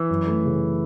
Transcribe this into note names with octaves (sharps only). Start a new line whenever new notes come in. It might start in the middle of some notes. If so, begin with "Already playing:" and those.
Already playing: E3
F#2
A3
C#3